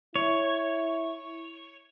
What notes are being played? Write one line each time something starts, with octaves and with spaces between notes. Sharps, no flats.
E4 C#5